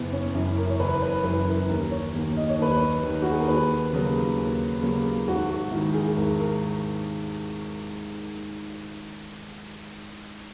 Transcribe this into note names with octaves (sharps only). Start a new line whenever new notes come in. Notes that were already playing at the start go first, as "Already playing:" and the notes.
Already playing: F#1 B3
C#4
F#2 E3
A#4
C#5
F#1 B4
B4
F#2 E3 B4
A#4
D#2 A#4
C#5
D#3 A#3
D#5
C#5
D#2 B4
C#5
D#3 A#3
F#4
G#4
A#4
D#2 B4
C#3 F#3 A#3
D#2
C#3 F#3 A#3
G#1 F#4
F#4
G#2 D#3 E4
G#4
G#4
G#1 A#4
A#4